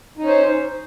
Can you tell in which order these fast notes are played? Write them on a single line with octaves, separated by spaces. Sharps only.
D#4 C#4 C5